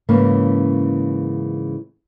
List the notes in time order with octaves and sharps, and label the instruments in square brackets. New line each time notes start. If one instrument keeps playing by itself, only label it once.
[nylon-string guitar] G#2 C#3 E3 A#3 C#4